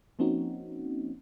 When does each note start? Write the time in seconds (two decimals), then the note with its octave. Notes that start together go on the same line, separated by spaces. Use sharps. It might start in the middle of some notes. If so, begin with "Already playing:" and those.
0.19 F3 A#3 C4 C#4 D#4 F#4